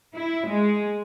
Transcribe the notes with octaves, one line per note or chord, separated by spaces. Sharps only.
E4
G#3